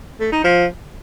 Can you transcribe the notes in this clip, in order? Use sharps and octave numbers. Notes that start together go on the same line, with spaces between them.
A3
D#4
F3